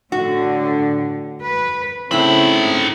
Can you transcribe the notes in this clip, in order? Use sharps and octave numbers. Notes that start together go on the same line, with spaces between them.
A2 D3 F#4
B4
A2 C#3 C4 D#4 E4 B5